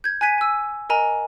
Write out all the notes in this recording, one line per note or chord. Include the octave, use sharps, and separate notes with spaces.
G6 G#6
G#5 F#6 G#6 B6 D#7
G#5 E6
A#4 D#5 G#5 A#5